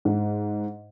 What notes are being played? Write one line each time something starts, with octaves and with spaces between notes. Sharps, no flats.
G#2